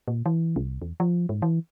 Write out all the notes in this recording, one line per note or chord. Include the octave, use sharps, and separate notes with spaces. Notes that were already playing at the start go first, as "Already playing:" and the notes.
A#2
E3
C2
E2
F3
G#2
E3